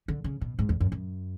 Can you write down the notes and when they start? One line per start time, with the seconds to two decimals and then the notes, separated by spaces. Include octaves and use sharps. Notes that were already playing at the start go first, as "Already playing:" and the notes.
0.08 D3
0.24 C#3
0.41 B2
0.59 G#2
0.69 E2
0.80 F#2
0.92 F#2